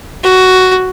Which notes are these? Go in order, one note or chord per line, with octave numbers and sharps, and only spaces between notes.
F#4